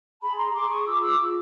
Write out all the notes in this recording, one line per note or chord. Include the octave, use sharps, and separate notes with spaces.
G#4 A5 B5
A#5 C6
G#4 C6 D6
C#6 D#6
F4 D6 E6
D6 E6
F4